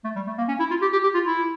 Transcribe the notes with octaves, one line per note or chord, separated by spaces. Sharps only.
A3
G3
A3
A#3
C#4
E4
F4
G4
G4
G4
F4
E4